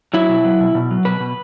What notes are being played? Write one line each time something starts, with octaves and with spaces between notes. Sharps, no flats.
F#3 E4
B2
F#3
B2
B2
F#3
B2 B4
B2